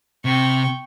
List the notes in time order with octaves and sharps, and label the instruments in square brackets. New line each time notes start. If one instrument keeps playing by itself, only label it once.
[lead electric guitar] C3 [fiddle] G5 C#6